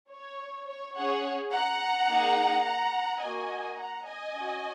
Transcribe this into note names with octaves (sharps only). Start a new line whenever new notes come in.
C#5
C#5
C#4 G#4 C#5 F#5
F#5 A#5
A#3 D#4 G#4
F#5 A#5
A#3 F#4 D#5 G#5
F#5 A#5
D#5 G#5
C#4 F#4